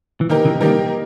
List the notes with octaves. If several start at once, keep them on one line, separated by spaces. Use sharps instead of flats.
E3
D#3 A#3 D#4 G4 A#4
C#3 E3
D#3 G3 A#3 D#4 G4 A#4